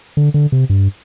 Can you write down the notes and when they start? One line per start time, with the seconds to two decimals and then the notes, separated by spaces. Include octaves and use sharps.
0.17 D3
0.34 D3
0.52 C3
0.70 G2